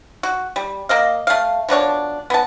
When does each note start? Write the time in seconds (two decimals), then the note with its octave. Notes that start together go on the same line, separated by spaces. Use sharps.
0.23 F#4
0.56 G3
0.89 A#3 D#5 F5
1.27 A3 F5
1.69 B2 F3 D4 C#5
2.30 B3 A5